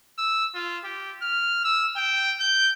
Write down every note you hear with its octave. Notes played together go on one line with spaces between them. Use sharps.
E6
F4
G4
F6
E6
G5
G6